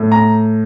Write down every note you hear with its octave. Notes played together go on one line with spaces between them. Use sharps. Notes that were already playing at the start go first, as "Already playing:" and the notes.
Already playing: A2
A#5